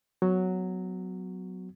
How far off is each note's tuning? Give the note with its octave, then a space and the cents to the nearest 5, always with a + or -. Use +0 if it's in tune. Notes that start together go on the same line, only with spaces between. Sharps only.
F#3 +0 B3 +30 F#4 +0